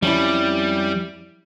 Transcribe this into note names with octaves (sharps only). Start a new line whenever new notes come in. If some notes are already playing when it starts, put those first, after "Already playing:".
F2 G3 C#4 E4